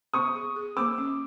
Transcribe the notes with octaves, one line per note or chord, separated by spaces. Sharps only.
B3 C#6 D#6
G#4
G#4
A#3 D6 E6
C#4